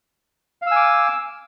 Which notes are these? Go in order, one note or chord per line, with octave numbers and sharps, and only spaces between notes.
F5 G#5 D6 E6